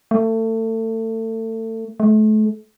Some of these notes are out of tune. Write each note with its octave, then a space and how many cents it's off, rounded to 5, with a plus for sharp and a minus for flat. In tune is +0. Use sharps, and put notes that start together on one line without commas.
A3 +30
A3 -35